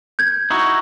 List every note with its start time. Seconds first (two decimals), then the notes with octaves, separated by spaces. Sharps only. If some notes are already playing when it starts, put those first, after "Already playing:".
0.19 G6 G#6
0.50 D#4 E4 F#4